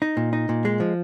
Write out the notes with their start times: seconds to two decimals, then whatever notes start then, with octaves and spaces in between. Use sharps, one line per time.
0.02 D#4
0.17 A#2
0.33 D#4
0.49 A#2
0.65 G#3
0.80 F3